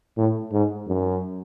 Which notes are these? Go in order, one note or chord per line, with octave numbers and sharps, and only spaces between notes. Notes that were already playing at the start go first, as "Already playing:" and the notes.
A2
G#2
F#2